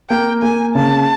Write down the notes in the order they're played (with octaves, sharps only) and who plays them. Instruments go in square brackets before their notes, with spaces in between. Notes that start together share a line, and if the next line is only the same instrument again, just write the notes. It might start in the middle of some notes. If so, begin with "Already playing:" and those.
[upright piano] A#3 [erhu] G5
[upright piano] A#3 [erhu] G#5
[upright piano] C#3 [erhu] A5